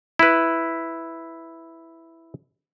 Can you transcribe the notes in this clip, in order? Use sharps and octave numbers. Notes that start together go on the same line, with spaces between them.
E4 B4